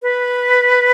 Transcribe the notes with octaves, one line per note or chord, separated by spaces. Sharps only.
B4